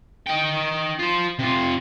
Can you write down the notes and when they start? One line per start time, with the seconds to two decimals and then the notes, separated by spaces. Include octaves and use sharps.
0.26 D#4 G5
0.99 F4 C5
1.39 C3 F4